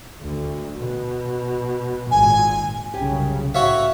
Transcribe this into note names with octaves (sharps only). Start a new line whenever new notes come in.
D2
B2
G#1 A#2 G#5
C2 F#2 C#3 G4 G#5
A2 F#4 C#5 E5 F5